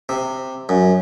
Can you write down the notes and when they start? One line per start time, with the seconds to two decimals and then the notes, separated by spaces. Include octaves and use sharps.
0.09 C3
0.69 F#2